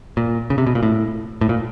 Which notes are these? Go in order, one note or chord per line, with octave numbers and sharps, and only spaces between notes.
A#2
C#3
C3
B2
A#2
A2
A2
A#2